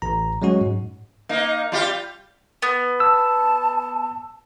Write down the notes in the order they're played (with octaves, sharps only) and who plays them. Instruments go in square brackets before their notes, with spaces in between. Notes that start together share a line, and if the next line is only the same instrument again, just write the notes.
[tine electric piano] A1 A#5
F#3 G#3 C#4 F#4
G#2
[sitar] A#3 D#4
G3 F4 G4
[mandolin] B3
[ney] A5 [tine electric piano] E6